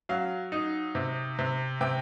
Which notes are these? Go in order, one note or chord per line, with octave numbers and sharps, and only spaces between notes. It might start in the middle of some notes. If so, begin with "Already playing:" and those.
F#3 F5
D#4
C3
C3
C3 G5